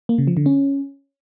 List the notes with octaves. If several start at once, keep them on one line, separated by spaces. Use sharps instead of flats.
A#3
C#3
F3
D3
C#4